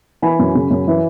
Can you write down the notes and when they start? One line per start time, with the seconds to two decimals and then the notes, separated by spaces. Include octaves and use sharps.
0.22 E3 G#5 B5
0.39 F#2
0.55 C#3
0.71 F#2
0.88 E3